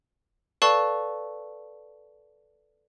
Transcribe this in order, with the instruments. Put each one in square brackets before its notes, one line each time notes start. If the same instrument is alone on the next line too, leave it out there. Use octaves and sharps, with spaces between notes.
[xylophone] A4 B4 D5 F5 A5 C#6